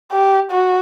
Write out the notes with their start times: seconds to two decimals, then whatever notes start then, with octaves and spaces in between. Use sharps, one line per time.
0.12 G4
0.51 F#4